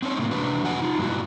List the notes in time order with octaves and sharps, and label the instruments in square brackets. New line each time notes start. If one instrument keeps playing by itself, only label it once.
[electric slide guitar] C4 C#4 D#4 A#4 C#5
A2 C3 A#3
C3 D4 F#4 B4
F2 D3 F#5 G#5
D#4 F4
G2 B2 A#3 C4 E4 F#4